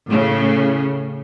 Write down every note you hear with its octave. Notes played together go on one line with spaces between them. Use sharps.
A2 C#3